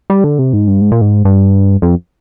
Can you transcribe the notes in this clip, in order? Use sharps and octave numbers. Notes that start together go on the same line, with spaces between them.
G3
D3
C3
G#2
G2
G#2
A#2
G#2
G2
F2